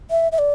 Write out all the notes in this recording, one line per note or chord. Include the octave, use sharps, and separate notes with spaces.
E5
E5
D5